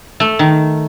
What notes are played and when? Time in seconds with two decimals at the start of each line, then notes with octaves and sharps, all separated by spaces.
0.20 A3
0.39 D#3